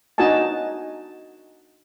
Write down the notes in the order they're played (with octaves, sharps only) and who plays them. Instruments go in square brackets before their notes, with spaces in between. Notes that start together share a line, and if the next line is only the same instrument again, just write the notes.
[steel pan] D4 D#4 F#4 D#5 G#5 A5